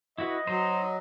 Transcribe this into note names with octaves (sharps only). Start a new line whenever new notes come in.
E4 F#4 B4 D#5
F#3 D#4 C5